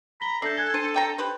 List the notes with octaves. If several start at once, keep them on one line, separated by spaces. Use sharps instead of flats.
A#5 B5 A#6 G7
D4 A4 E5 G6 A#6 C7
G#5 F#6 G#6 G7
D4 C5 A5 A6 D#7
C3 G5 A#5
G4 B4 C5